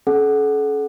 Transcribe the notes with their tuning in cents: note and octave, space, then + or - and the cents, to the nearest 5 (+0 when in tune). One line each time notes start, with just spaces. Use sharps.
C#4 +0 A4 -40 F#5 +5